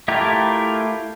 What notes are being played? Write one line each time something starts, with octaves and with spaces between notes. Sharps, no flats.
A3 E4 F4 G4 A#4